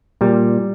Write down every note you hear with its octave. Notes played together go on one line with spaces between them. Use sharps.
A#2 G3